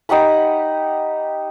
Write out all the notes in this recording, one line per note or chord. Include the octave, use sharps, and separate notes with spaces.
D#4 G4 F#5 B5